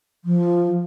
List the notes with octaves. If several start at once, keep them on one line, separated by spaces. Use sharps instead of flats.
F3